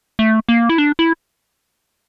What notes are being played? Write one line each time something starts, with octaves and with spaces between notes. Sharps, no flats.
A3
A#3
E4
D4
E4